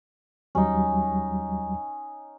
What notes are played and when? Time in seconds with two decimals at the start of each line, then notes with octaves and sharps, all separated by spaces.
0.55 D#2 F#3 G3 C#4 D#4